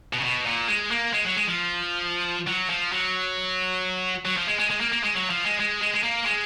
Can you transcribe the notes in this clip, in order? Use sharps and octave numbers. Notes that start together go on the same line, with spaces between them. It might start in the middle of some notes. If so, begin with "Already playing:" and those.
B2
C#3
B2
A#2
G#3
A#3
G#3
F#3
G#3
F3
F#3
F3
F#3
F#3
F3
G#3
G#3
G#3
A#3
A#3
G#3
F#3
F3
G#3
G#3
G#3
G#3
A#3
G#3